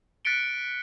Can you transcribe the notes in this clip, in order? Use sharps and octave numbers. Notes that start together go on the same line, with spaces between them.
F#6 A6 B6 C#7 D7 G7